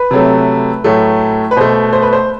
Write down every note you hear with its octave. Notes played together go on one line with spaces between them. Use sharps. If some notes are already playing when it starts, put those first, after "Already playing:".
Already playing: B4
C3 F#3 A3
A2 F#3 A3
B4
B2 A3 C5
C5
B4
C5